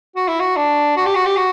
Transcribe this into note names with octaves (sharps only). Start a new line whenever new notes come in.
F#4
E4
F#4
D4
F#4
G4
F#4
G4
F#4